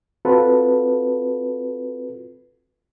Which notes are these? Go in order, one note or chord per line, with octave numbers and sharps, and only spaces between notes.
C4 F4 F#4 A4 B4